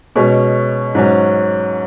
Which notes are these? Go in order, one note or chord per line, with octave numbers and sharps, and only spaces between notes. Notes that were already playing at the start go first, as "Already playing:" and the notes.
B2 G#3 C#4
G#2 F#3 C#4